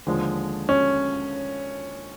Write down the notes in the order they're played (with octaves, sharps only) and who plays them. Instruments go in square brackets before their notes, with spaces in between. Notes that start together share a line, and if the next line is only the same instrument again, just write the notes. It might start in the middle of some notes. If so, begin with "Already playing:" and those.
[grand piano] D#2 D3 F3 G#3
C#4